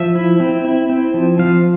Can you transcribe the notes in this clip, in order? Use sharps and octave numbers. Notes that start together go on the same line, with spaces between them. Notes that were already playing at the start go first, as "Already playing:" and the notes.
Already playing: F3 E5
E4
C4
E4
C4
F3
F3 F5